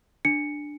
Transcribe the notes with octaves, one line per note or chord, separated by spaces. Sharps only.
D4 C#7